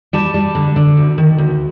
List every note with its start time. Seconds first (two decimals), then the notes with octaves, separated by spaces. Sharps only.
0.13 G3 A5
0.34 G3
0.55 D3
0.76 D3
0.97 D2
1.18 D#3
1.38 D2